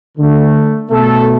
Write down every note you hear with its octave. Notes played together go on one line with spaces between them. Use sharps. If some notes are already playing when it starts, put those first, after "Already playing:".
D3 A3
B2 A3 A4